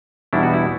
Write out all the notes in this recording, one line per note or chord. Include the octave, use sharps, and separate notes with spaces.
E2 B2 G3 D4 E4
F#4
E4